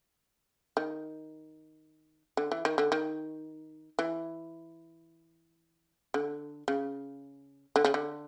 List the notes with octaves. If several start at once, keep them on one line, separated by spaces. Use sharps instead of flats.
D#3
D3
E3
D#3
D3
D#3
E3
D3
C#3
D3
C#3
D3